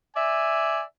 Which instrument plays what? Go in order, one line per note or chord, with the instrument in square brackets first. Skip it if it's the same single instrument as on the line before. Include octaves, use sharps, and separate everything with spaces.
[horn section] D5 E5 G#5